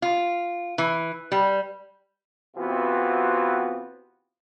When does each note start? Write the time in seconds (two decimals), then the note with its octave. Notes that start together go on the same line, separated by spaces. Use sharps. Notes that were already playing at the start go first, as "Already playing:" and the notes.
0.02 F4
0.78 E3
1.32 G3
2.57 C3 E3 B3 C4 F4 F#4